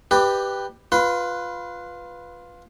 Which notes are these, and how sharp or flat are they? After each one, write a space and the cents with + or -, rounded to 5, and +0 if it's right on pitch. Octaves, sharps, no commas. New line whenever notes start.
G4 +0 B4 +0 D5 +30
F4 +10 B4 +0 C6 -35